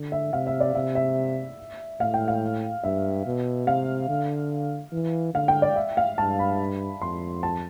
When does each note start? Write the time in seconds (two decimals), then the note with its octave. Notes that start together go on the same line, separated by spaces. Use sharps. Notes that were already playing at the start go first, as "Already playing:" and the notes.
Already playing: D3
0.12 E5
0.33 C3 F5
0.47 E5
0.60 D5
0.75 C3 E5
0.95 E5
2.00 A2 F5
2.14 G5
2.28 F5
2.84 G2 E5
3.26 B2
3.67 C3 F5
4.09 D3
4.92 E3
5.34 D3 F5
5.48 G5
5.62 D5
5.76 E5
5.97 F5
6.18 G2 A5
6.39 B5
7.02 F2 C6
7.43 A5